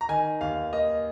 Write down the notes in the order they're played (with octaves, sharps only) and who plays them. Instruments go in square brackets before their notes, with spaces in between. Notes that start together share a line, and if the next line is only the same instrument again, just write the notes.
[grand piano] A#5
D#3 G#5
D#2 F5
A#3 D#5